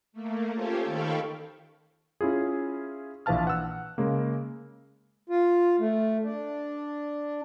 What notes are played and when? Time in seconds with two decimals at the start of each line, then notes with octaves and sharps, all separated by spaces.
0.13 A3 A#3
0.54 C#4 F4 G4 A4 C5 C#5
0.85 D#3 A4 F5 G5 B5 C#6
2.21 C#4 E4 F4 G#4
3.26 A#1 E3 B4 F5 A5 F6
3.47 F#5 E6
3.98 C#3 G#3 A#3
5.29 F4
5.79 A3
6.23 D4